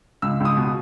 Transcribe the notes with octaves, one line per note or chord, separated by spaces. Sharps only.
C#2 E6
C#2
D#6
B2